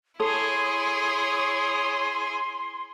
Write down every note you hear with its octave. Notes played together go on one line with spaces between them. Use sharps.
E4 G#4 A4 C#5 C6 D#6